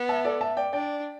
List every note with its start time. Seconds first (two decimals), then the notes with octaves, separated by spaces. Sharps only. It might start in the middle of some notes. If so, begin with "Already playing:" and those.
Already playing: B3
0.09 E5 A5
0.24 A4 D5
0.41 E5 A5
0.57 D5 G5
0.73 D4 D5 G5